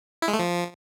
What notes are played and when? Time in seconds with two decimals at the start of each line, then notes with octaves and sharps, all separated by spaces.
0.22 E4
0.28 G#3
0.34 A3
0.39 F3